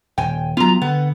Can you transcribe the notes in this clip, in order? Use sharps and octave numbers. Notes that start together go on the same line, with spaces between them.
D#1 G5 G#5
F#3 B3 F4 A#5
D3 B3